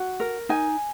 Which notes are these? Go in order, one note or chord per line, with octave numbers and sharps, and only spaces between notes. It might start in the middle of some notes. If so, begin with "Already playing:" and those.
Already playing: F#4
A#4
D#4 G#5